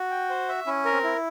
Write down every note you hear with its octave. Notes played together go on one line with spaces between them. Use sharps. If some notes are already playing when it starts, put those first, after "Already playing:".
Already playing: F#4
G5
C5
E5
C#4 E4
A#4
C4
E4